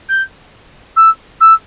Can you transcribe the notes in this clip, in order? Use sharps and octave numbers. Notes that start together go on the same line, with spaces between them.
G6
E6
E6